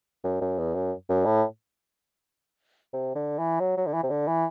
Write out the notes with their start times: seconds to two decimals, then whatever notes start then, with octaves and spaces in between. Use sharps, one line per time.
0.24 F#2
0.41 F#2
0.58 E2
0.74 F#2
1.09 F#2
1.25 A2
2.93 C3
3.15 D3
3.39 E3
3.60 F#3
3.77 F#3
3.87 D3
3.94 E3
4.03 C3
4.10 D3
4.28 E3